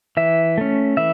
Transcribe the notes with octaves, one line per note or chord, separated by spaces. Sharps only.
E3 E5
A3 C#4
E3 E5